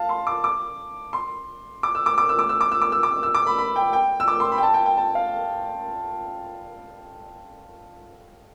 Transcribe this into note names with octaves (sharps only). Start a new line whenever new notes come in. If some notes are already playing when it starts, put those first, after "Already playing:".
Already playing: F5 A5
C6
D6
D6
C6
D6
E6
D6
D6
E6
D6
E6
D6
E6
D6
E6
D6
E6
D6
B5
B5
G5
G5
E6
D6
C6
B5
G5
A5
G5
G5
A5
F5